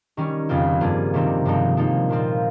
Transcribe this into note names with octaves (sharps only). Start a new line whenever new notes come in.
D#3 G3 C#4
F2 C#3 G3 C4 F4
G2 G3 A#3 F4 G#4
C3 D#3 G3 C4 D#4
G2 F3 G#3 C4 D#4
F3 A#3 D#4
A#2 F3 C4 F4